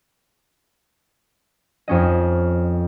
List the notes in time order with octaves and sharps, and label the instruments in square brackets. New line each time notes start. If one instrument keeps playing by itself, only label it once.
[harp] F2 C#4 D#5